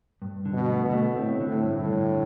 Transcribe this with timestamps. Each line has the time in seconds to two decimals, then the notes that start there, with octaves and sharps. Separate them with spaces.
0.22 G2
0.45 D3
0.53 B2
0.69 A3
0.85 B2
0.92 A3
1.16 A2 C4
1.40 D3
1.48 A2
1.63 G2
1.79 A2
1.87 D3